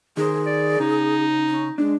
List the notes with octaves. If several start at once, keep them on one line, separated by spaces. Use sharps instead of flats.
D#3 G#4 A#4 C5
D5
C#3 D#4
C#4
G#3 D4